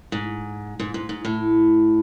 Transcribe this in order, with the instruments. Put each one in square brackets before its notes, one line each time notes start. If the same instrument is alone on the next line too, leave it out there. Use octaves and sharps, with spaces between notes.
[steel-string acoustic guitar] G#2
G#2
G#2
G#2
A2